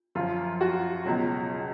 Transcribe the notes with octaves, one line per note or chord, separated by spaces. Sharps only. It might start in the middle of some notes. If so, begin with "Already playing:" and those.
F#2 F3 F4
F#4
C#2 B2 F#3